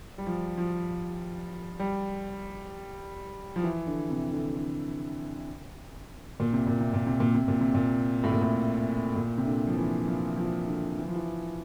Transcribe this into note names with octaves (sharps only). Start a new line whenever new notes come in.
G3
F3
F3
G3
F3
E3
D3
C3
D3
D3
A#2
C3
A#2
C3
A#2
C3
A#2
C3
A#2
C3
A#2
A2
A#2
A2
A#2
C3
D3
F3
E3
F3
F3
D3
E3
F3
E3